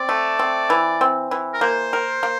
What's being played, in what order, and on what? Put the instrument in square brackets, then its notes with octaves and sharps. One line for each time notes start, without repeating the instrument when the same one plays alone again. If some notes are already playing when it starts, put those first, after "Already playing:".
Already playing: [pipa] C4 [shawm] D5
[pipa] A3
C4
E3
C4
E3
[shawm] A#4
[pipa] A#3 [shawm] C5
[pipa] A#4
A#3